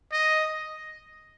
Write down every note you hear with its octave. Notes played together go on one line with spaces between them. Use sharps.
D#5